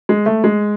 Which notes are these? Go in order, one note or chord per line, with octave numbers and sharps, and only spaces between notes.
G#3
A3
G#3